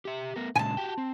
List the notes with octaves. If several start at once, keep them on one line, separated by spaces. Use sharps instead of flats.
G4 E5
A3 B3 A#4
A#2 C#3 G#3 G#5 A5
F#4 G4 G5
C4